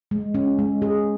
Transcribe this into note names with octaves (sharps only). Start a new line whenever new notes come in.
G#3
C#4
G#3
G#4